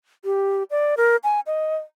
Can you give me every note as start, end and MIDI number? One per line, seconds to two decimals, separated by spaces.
0.25 0.63 67
0.71 0.95 74
0.97 1.17 70
1.24 1.40 80
1.47 1.77 75